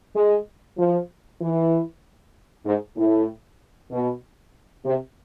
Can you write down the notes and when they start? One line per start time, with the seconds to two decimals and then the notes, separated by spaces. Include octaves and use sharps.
0.16 G#3
0.78 F3
1.41 E3
2.66 G#2
2.97 A2
3.91 B2
4.85 C3